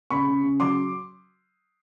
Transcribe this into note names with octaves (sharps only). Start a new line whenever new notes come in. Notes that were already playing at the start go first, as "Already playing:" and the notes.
C#3 B5 C#6
C#3
C#3
F#3 C6 D6